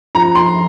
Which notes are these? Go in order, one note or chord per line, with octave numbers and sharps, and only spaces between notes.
F3 A#5
C6